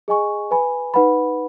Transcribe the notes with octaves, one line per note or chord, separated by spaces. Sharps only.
G#4 D#5 G#5 C#6
B4 G#5 B5
D#4 B4 F#5 B5